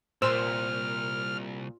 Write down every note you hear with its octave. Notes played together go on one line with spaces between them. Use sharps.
C2 A#2 C5 E6 F6